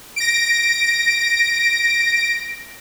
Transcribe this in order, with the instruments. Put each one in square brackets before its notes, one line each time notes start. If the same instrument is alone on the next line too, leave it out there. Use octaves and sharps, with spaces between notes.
[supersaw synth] A#6 D7